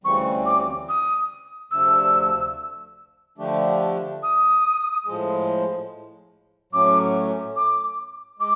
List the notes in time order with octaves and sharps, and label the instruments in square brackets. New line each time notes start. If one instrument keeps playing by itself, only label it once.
[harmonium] D2 C#3 E3 G3 C4 [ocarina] C#6
[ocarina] D6
D#6
[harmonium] D2 C3 F3 A3 D4 [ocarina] E6
[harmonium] D3 F3 A3 D4 G4
[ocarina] D#6
[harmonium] A2 F3 G#3
[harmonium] A2 F#3 A3 C#4 [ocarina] D6
[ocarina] D6
[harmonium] G#3 [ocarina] D6